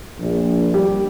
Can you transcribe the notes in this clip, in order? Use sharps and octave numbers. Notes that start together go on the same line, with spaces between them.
A#1
G3